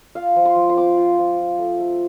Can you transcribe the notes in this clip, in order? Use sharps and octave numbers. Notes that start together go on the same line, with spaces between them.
F4 F5
F3
C6
F3
C6
C4 D6
F4
F3
F4
A3
A3